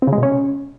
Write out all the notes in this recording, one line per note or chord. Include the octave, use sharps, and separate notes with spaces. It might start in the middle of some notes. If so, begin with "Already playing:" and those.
C4
C#3
G#3
B2
C#4